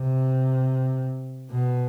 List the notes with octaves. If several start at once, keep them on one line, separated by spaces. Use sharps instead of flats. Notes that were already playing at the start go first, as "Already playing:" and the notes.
Already playing: C3
B2